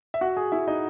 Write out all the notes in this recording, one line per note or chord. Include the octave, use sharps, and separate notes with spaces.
E5
F#4 F#5
G#4 G#5
E4 E5
D#4 D#5